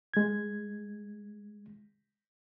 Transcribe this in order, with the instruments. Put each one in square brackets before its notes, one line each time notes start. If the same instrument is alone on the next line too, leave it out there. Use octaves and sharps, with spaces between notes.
[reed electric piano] G#3 G#6